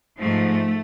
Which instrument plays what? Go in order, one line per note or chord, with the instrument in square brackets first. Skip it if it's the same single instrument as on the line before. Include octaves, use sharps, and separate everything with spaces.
[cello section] G#2 F3 A3